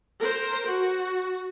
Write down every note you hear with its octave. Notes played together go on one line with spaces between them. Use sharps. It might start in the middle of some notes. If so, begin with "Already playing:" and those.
A#4 C5
F#4